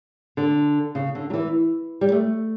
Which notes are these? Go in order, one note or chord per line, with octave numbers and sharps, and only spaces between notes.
D3
C#3
D3
F#3
E3
G3
A3